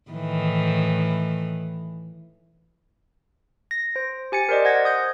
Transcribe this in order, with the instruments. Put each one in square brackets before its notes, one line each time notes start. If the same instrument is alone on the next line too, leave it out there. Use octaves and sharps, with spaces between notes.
[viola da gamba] A2 D#3 E3
[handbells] A#6
C5
G4 G#5 A6 C#7
A#4 C5 D5 D#5
C5 F#5 G#6 A#6
D#6 G6